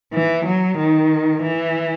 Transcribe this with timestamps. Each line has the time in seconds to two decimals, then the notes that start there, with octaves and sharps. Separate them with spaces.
0.13 E3
0.46 F#3
0.78 D#3
1.42 E3